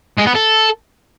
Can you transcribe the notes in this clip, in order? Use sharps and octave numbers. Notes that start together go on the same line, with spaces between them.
G#3
B3
A4